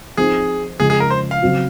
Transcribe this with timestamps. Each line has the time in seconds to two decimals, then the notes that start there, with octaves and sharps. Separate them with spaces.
0.17 F3 C4 D#4 G#4
0.80 F2 C#3 G#3 G#4
0.90 G#4
1.00 A#4
1.10 C5
1.31 F5
1.42 C#3 F#3 C4 F#4